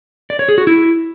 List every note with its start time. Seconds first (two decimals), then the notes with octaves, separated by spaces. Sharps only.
0.30 D5
0.39 C#5
0.49 G#4
0.58 F#4
0.67 E4